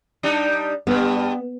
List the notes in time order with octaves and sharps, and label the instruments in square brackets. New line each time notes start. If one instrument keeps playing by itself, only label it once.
[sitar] G3 D4 D#4
[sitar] G2 G3 [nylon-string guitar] B3